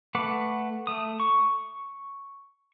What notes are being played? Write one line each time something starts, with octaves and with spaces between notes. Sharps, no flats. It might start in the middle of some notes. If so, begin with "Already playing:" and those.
A3 B4 F#5 D6
A3 D#6
C#6